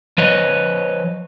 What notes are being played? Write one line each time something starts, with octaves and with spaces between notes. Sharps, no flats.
F3 B4 C#5 D#5